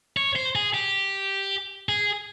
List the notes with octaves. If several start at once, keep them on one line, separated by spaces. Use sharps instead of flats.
C#5
C5
G#4
G4
G#4